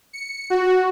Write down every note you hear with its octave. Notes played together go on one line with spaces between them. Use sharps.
C#7
F#4